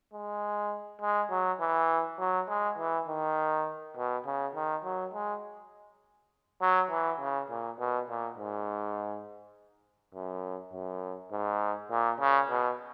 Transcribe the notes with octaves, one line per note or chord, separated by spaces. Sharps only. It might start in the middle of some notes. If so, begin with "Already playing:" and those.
G#3
G#3
F#3
E3
F#3
G#3
E3
D#3
B2
C#3
D#3
F#3
G#3
F#3
E3
C#3
A#2
B2
A#2
G#2
F#2
F#2
G#2
A#2
C#3
B2